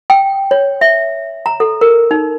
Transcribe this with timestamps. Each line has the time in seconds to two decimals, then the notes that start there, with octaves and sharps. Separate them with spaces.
0.10 G5
0.51 C#5
0.81 E5
1.46 A#5
1.60 A4
1.81 A#4
2.11 D#4